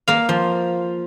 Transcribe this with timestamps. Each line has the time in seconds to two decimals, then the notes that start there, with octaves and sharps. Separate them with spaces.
0.08 A#3 F5
0.29 F3